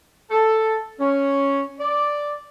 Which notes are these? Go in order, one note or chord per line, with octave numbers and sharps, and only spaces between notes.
A4
C#4
D5